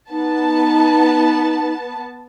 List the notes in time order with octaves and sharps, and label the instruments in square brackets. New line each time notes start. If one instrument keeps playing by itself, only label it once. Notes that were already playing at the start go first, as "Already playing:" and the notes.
[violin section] B3 A5 [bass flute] D#4